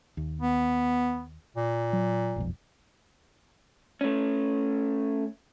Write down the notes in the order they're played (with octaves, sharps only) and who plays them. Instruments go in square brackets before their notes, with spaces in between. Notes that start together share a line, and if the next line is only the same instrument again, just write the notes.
[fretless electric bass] D#2
[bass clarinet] B3
A#2
[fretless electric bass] F#3
E1 B1 F2
[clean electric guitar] A3 C#4